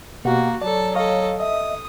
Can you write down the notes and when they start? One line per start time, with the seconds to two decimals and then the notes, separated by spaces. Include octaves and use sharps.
0.25 B2 A#3 F#4 G4 F#5
0.62 F#3 A4 D5 A5
0.95 A4 C#5 D#5 F5
1.40 D#5 E5 D#6